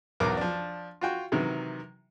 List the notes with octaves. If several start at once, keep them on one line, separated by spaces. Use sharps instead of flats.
B1 E2 A#4 D6
F3 D4
F4 F#4 G5
C3 D#3 E3 F#3